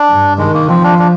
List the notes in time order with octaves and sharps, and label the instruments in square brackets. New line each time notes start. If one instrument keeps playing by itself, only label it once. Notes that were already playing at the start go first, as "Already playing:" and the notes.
Already playing: [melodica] D4
[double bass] G2
[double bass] D#3 [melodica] G#3
[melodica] A#3
[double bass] F3 [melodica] C4
[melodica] D4
D4